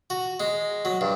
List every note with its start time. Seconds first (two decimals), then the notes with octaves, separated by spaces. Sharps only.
0.10 F#4
0.40 G#3
0.85 F#3
1.01 G2